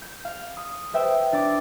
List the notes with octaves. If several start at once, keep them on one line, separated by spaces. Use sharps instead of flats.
G6 G#6
F5
D#6
B4 C5 E5 G5 D#6
D4 D5 D6